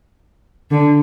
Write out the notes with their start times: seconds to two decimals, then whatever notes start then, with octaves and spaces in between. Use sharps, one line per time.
0.71 D3